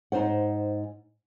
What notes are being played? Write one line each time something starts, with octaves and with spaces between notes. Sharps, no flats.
G#2 D#4 G#4 C5 F#5